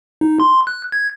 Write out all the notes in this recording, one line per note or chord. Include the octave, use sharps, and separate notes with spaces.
D#4
C6
F#6
G#6